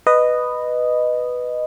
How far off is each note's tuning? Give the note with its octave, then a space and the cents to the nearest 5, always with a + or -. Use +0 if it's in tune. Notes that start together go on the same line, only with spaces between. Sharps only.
B4 +0 D#5 -10